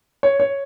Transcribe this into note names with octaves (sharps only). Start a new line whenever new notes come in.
C#5
C#5